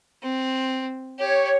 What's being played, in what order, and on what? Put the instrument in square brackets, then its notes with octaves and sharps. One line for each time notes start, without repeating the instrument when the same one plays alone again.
[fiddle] C4
[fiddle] G4 [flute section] C#5